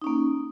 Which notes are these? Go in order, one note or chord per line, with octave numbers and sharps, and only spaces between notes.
A#3 C#4 D#4